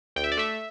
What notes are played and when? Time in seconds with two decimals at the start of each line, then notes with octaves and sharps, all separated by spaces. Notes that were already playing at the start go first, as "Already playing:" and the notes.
0.16 D2 G5
0.24 E5
0.32 D5
0.37 A3 E5